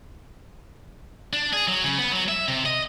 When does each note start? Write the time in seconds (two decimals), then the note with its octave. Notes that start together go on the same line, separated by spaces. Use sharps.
1.33 D4
1.53 G#4
1.67 F#3
1.84 C#3
1.98 B3
2.12 F#3
2.29 E5
2.48 C3
2.66 D#5